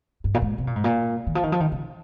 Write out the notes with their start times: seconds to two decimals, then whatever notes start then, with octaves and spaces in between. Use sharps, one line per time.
0.24 G2
0.34 A#2
0.42 G#2
0.58 C3
0.67 A#2
0.76 G#2
0.84 A#2
1.27 D#3
1.35 F3
1.43 D#3
1.52 F3
1.60 D#3
1.72 C#3